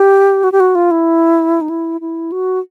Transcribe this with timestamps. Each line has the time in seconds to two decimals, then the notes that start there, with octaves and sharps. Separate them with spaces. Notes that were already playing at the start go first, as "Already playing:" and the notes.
Already playing: G4
0.44 F#4
0.52 G4
0.60 F#4
0.75 F4
0.91 E4
1.61 D#4
1.69 E4
2.01 E4
2.32 F#4